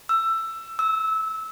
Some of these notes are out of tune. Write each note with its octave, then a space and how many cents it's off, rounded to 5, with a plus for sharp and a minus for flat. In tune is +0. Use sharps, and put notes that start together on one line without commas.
E6 +15
E6 -20